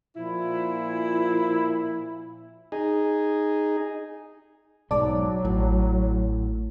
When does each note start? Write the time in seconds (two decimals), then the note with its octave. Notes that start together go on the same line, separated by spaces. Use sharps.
0.17 A#2 F3 E4
2.72 D#4 G#4
4.91 B1 G#2 F#3 D5 A5 D6
5.45 A1 A2